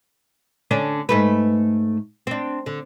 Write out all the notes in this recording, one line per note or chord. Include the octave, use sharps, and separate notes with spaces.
D3 C#4 D4
G#2 A3 B4
C4 D4
D3